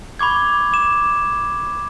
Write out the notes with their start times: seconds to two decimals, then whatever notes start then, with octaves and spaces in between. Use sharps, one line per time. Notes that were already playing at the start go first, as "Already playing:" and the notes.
0.19 B5 C#6 D6 G#6
0.73 D6 E7